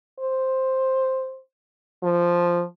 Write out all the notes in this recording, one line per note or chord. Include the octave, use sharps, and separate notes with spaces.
C5
F3